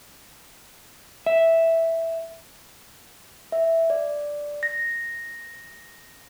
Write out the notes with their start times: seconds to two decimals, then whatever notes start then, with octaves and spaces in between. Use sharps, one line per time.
1.26 E5
3.52 E5
3.90 D5
4.63 A#6